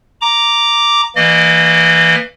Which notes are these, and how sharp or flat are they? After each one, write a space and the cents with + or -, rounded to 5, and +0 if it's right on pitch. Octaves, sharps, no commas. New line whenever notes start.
A#5 +0 D6 +0
E3 +0 A#3 -15 D#5 -40